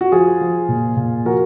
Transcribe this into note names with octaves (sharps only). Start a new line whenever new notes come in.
F#4
F3 F4 G#4
F3
A#2
A#2
F3 F#4 A#4